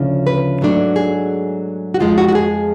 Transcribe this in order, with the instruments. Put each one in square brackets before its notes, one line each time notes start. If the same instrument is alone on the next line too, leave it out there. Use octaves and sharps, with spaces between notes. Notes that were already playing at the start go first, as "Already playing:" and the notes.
Already playing: [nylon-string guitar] D2 C#3 F3 D4
B4
G#2 F#3 A3 D4
G#4
F#4
F2 F3 G#3 F4
F#4
F#4
G#4